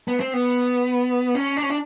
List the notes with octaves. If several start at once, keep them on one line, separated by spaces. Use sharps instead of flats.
B3
C4
B3
C#4
D4
C#4
D4